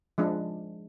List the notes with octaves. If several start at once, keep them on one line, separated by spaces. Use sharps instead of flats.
F3 G#3 D4